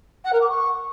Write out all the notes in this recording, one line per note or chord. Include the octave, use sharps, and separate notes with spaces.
F#5
A#4
D6
C#6